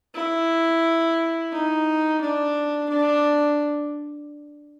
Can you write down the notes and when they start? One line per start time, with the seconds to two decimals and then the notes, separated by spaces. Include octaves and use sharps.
0.14 E4
1.53 D#4
2.21 D4
2.90 D4